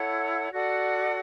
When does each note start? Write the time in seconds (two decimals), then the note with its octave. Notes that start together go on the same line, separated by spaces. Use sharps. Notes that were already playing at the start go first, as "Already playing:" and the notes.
Already playing: E4 A4 C#5 F#5
0.51 F#4 A4 D5 F#5